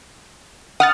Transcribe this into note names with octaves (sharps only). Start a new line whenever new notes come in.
F#5 D#6 F6 A6